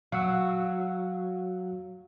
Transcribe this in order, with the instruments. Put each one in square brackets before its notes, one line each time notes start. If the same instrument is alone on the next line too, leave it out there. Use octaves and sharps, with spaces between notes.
[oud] F#3 [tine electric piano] F5 F#5 E6